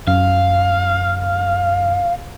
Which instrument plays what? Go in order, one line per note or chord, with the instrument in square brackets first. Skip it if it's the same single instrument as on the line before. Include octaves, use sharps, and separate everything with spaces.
[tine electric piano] F#2 [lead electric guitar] F5